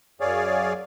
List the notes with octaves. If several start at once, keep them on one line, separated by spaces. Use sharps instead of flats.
F#2 G#4 C#5 D5 F5